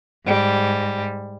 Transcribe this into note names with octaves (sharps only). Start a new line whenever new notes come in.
G#2 G3